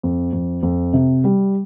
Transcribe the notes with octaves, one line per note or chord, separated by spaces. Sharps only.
F2
F2
F2
C3
G3